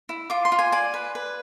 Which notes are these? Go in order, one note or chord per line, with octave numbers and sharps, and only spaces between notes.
E4
F4 D6
C6
F4
G#5
D5 G#5
B4
B4